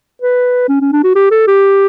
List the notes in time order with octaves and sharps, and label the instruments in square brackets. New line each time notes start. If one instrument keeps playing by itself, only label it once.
[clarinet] B4
C#4
C#4
D4
F#4
G4
A4
G4